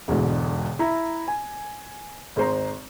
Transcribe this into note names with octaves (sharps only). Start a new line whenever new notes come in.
E1 E2 G#2 B2 D3
E4 E5 A#5 B5
G#5
G#1 G#3 C5 A#5